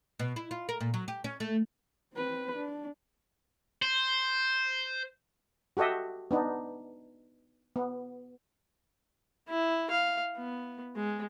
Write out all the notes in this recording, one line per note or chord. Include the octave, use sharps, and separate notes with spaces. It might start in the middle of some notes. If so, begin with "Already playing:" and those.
B2
E4
F4
A#4
A#2
F#3
G4
C#4
A3
C4 B4
D4
C5
F#4 G4 A4 D#5 E5
B3 D4 D#4
B3
E4
F5
B3
G#3